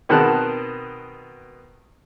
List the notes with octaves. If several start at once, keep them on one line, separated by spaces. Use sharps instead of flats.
B2 D#3 C4 F#5 A5 F#6